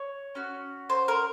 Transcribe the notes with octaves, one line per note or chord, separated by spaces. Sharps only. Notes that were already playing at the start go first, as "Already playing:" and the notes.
Already playing: C#5
C#4 F#4
C5
A#4